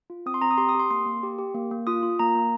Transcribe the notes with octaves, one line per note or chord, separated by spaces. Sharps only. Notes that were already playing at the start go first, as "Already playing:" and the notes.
F4
C4 D#6
C6
C4 A#5
D#6
G4 C6
D#6
G4 C6
A#3 C6
A#3
G4
G4
A#3
A#3
F4 D#6
F4
A#3 A#5
A#3